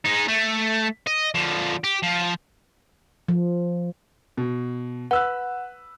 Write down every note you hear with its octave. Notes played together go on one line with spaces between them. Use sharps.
G#3 D#4
A3
D#5
D3 F3
G4
F3
F3
B2
B4 F#5 E6 F#6